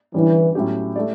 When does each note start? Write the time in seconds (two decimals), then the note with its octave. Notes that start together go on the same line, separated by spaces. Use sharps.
0.14 D3 E3 G3 C#4
0.55 A2 F#3 C#4 G4
0.96 A3 E4 G4 D5